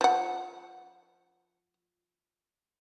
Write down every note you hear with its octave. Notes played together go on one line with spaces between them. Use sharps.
F3 F#5